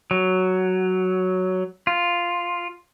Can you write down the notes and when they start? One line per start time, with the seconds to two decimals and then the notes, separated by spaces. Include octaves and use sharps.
0.11 F#3
1.87 F4